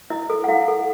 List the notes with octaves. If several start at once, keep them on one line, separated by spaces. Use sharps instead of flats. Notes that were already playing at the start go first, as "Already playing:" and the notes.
E4 D#5
A4
F#5
E4 F5
A4